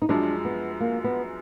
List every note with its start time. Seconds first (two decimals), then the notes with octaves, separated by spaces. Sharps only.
0.02 D#4
0.09 F#2 F3 G#3 D4
0.45 B3
0.80 A#3
1.04 B3